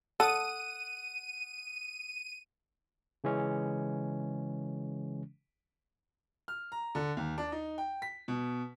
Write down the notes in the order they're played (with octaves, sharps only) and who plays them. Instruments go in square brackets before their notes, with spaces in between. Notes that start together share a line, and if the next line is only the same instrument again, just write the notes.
[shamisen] A4 [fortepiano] F#5 D#6 [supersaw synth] D#7
[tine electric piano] C#3 E3 G#3 C#4
[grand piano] F6
A#5
D3
D#2
D4
D#4
G5
B6
B2